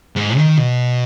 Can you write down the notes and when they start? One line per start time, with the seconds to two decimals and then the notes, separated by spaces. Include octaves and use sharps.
0.17 G#2
0.38 D#3
0.58 B2